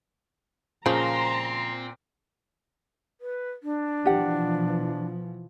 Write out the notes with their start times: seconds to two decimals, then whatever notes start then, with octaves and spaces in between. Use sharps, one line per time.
0.86 A#2 C#3 F3 C4 A#5 C6
3.21 B4
3.63 D4
4.06 B2 E3 F3 G4 F#5